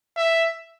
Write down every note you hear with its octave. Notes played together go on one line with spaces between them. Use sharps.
E5